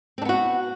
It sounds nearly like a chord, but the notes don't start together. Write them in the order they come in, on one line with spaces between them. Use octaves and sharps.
C4 D4 B3 F#4